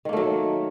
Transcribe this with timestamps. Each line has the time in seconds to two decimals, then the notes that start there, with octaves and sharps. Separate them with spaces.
0.05 D#3
0.09 A#3
0.13 A3
0.17 F#3